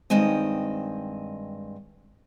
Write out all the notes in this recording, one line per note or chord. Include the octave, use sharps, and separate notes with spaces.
G2 D#3 G#3 C4 D#5